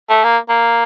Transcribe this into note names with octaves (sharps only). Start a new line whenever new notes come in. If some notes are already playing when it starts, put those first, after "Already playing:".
A3
A#3
A#3